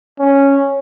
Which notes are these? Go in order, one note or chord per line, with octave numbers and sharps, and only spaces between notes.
C#4